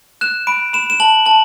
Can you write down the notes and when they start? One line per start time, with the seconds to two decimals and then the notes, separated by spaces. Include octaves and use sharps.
0.21 F#6 E7
0.47 B5 D7
0.73 B5 E7
0.90 E7
1.00 A5 F#7
1.26 A5 F#7